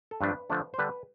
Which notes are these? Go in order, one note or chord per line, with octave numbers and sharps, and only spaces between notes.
A4
G2 F3 A3 D4 B4
D3 F3 A3 D4
C5
D3 G3 D4 B4